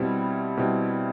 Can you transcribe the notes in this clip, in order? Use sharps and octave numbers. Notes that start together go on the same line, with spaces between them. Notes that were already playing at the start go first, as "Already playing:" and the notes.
Already playing: B2 G3 C4 E4
B2 G3 C4 E4